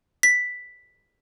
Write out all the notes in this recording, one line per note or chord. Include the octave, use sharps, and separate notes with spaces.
B6